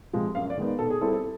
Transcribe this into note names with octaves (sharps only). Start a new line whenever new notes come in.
C3 F3 G#3
F#2 F5
D5
D#3 G#3 B3 D#4
B2 A4
G#4
G3 C4 E4 A4
A4